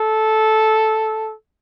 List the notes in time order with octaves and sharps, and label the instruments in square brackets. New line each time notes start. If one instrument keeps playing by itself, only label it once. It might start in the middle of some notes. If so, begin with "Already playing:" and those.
Already playing: [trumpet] A4